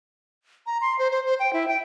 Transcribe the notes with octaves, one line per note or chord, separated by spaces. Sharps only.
A#5
C6
C5
C5
C5
G5
E4
G5